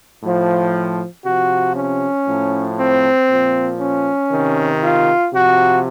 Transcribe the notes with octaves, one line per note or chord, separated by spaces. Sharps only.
A2 F3
C3 F3 F#4
C#4
A2 F3
C4
A#2 F3
C#4
C3 D#3
F4
C3 F3 F#4